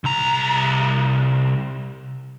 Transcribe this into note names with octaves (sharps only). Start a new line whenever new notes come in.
C2 A#5